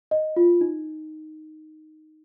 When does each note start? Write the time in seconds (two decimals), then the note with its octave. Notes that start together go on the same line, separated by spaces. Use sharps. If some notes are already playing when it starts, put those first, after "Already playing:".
0.11 D#5
0.36 F4
0.61 D#4